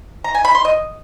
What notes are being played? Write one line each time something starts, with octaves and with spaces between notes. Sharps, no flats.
A#5
G#5
B5
C6
D#5